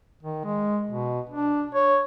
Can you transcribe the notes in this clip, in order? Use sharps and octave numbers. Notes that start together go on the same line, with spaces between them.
D#3
G#3
B2
D4
C#5